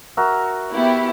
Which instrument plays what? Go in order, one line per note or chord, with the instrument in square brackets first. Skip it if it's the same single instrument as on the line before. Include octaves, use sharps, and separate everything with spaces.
[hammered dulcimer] F#4 A#4 E5
[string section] B3 E4 G4